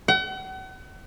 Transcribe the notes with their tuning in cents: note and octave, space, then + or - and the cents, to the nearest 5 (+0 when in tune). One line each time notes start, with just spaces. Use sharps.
F#5 +40